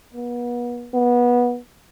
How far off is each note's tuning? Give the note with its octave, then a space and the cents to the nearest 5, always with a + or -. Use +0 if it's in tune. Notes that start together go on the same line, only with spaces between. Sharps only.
B3 -35
B3 -20